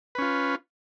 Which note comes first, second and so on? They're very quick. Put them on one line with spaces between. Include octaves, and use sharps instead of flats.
B4 C#4 F4